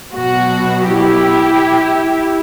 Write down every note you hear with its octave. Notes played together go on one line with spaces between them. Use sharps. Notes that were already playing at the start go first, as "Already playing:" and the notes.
B2 F#3 F#4
E4 G4